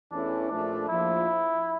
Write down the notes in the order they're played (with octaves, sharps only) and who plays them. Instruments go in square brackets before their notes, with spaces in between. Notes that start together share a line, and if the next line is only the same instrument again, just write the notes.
[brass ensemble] E2 E3 A3 C#4 E4 [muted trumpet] D4
[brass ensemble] A#1 A#2 F3 A3 [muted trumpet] D4
[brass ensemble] A#1 A#2 F3 [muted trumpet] E4